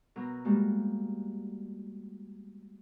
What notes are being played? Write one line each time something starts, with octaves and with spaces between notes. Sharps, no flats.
B2 F#3 A#4 E6
G3 G#3 A#3 F#4